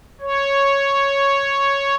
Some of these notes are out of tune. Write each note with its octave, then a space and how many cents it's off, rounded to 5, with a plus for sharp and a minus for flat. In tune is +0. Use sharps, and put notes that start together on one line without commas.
C#5 +0